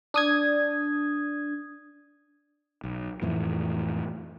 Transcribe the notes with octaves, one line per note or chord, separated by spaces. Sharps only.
D4 D#6 G#6
B1
F2 A2 E3